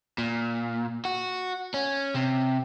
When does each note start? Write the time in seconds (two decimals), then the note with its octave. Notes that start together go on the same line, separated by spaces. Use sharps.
0.18 A#2
1.05 F#4
1.74 C#4
2.15 C3